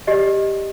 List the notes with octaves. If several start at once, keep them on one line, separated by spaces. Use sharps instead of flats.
G4 D5 D#5